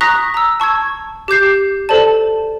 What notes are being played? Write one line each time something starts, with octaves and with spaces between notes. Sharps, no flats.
A#5 C#6 D#6 F#6 A#6 B6
A#5 E6
A5 C#6 E6 G#6
G4 D6 G6 C7
A4 C5 D5 A5